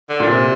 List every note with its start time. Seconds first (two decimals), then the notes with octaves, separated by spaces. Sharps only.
0.09 D3
0.20 A#2 D3
0.29 C3